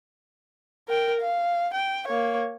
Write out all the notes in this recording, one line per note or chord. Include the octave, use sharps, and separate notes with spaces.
A#4 G5
F5
G5
A#3 C#5